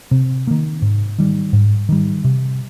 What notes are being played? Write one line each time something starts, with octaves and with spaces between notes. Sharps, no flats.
C3
D#3 A#3
G#2
D#3 G3
G#2
D#3 G3
C3